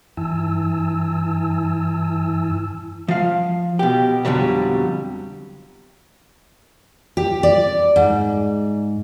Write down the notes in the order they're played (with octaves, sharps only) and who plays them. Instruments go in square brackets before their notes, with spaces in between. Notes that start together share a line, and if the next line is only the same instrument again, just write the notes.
[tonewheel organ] G2 E3 E4 G#5 A5 E6
[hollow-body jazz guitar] F3 F5
B2 G4
F2 B2 D3 F#3 G3
[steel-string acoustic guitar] G4
D5
G#2